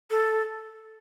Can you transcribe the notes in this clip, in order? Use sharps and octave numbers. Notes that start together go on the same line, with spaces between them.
A4